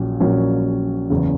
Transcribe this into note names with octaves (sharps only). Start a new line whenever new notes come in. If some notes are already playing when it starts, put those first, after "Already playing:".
Already playing: A#1 A#2 F#3 C#4
A#1 A#2 F#3 A#3 C#4
F#1 E2 C#3